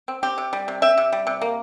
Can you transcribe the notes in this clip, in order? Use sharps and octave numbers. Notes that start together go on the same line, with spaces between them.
C4
C4 G4
C3
G3
C3
C4 E5
C3
G3
C3
A#3